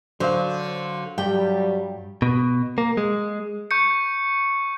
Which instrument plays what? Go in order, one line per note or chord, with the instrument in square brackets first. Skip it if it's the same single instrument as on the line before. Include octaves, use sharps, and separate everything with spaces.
[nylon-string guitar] D3 [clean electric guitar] F#3 [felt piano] C5 F5
[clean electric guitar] G2 [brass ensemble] F#3 G3 [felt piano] G4 [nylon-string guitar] G5
[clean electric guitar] B2
A#3
G#3
[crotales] C#6 G6 C#7